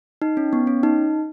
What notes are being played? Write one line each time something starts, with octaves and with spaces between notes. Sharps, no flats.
D#4
C#4
B3
C#4
D#4